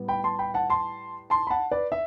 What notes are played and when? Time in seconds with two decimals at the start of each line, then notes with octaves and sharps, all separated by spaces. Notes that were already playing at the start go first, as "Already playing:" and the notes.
Already playing: A2 G3 B3
0.08 G5 B5
0.24 A5 C6
0.39 G5 B5
0.54 F#5 A5
0.70 A5 C6
1.30 A5 C6
1.47 B5
1.50 F#5 A5
1.71 B4 D5
1.92 E5